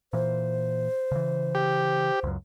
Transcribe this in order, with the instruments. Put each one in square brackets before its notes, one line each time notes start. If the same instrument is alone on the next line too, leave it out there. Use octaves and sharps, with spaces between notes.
[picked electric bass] A#2 E3 [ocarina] C5
[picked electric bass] C#3 E3
[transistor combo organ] G4
[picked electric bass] C#2 F#2